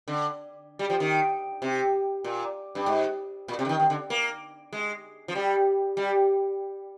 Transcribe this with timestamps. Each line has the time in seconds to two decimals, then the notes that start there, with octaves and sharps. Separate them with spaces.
0.08 D3
0.79 G3
0.90 F3
1.00 D#3
1.62 C3
2.24 A#2
2.75 G2
2.86 G#2
3.48 A#2
3.59 C3
3.65 D3
3.69 D#3
3.80 D#3
3.90 D3
4.10 A#3
4.73 G#3
5.28 F3
5.35 G3
5.97 G3